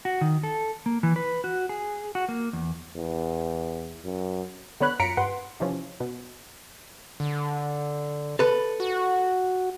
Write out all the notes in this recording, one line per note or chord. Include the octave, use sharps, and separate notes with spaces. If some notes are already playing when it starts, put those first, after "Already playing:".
F#4
D#3
A4
A#3
E3
B4
F#4
G#4
F#4
A#3
E2
E2
F#2
D3 B3 C#5 B5 F#6
F#2 F4 A#5 B6 C#7 D7
G2 B4 F#5 C6
C3 E3 F3 C#4
B2
D3
A4 B4
F#4